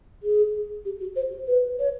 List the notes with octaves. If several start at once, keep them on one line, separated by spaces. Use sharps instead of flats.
G#4
G4
F#4
C5
B4
C#5